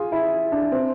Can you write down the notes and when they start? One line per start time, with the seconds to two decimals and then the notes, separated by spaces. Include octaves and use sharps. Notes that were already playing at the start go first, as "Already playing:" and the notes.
Already playing: F4 G#4
0.12 E4
0.52 D4
0.72 C4